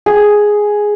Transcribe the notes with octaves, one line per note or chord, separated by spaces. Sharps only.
G#4